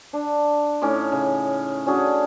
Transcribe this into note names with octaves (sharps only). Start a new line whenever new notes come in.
D4
A2 C#4 D#4 D6
C#3
C#4 D4 F#4 G#4